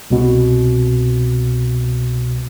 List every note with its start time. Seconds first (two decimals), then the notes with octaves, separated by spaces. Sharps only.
0.11 C2 B2